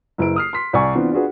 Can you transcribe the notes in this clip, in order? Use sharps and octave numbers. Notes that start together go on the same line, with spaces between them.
F#1 E4 B4 D7
D#6 F6 C7
C6 B6
C2 D5 G#5 C#6
E3 B3 C4 D4 F4
D4 F4 F#4 G#4 B4